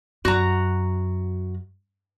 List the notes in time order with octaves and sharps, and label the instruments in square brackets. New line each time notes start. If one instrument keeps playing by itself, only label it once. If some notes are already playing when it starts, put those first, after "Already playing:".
[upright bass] F#2 [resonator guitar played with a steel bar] F#4 A#5